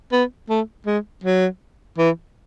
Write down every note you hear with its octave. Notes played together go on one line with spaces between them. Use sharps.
B3
A3
G#3
F#3
E3